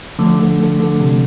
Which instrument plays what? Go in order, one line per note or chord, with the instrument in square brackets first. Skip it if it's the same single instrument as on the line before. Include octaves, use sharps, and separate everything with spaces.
[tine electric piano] D3 [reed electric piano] F3 A3
[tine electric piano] D3
D3
D3
C3